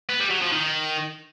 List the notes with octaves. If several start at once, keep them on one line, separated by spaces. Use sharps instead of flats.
B3
G3
F#3
F3
D#3